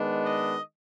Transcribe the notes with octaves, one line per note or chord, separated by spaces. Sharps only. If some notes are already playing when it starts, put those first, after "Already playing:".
Already playing: D#3 G#3 B3 D4
D#5